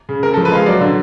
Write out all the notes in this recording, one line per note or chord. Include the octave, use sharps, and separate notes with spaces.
C#3
C#3 A#4
A4
F3
B4
G#3 F5
F#3 D5
D3